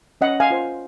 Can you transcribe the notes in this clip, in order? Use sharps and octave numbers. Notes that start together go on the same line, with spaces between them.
C#4 D#5 F#5
F5 G#5
F4 C5